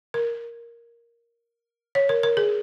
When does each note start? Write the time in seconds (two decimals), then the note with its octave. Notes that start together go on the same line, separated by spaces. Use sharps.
0.14 A#4
1.95 C#5
2.09 A#4
2.23 A#4
2.37 G#4